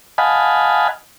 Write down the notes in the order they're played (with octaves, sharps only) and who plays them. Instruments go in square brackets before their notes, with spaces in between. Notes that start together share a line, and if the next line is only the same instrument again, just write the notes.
[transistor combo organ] D#5 F5 F#5 G#5 A5 B5